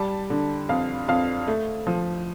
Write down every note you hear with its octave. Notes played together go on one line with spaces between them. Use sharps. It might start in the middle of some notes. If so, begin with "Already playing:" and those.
Already playing: G3 A5
D3
F2 F5
F2 F5
A3
F3